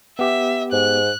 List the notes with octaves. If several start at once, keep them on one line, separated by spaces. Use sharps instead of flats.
B3 G4 E5
G#2 F#6